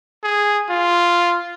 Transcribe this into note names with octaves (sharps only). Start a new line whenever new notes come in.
G#4
F4